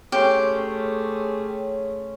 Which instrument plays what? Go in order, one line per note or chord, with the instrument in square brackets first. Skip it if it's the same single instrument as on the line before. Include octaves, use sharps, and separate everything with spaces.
[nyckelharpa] A3 G#4 [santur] C#4 C6 [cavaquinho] G4